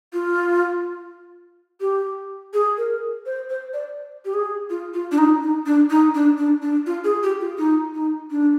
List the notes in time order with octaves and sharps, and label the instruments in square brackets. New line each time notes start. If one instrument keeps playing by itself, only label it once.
[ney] F4
G4
G#4
A#4
C5
C5
D5
G4
G#4
F4
F4
D4
D#4
D#4
D4
D#4
D4
D4
D4
F4
G#4
G4
F4
D#4
D#4
D4